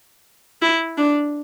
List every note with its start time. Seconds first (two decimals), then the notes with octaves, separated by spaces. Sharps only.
0.62 E4
0.97 D4